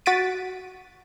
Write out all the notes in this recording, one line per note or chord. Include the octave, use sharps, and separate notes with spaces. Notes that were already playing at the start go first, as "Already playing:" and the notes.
F#4 F#5 A6 B6 D7 D#7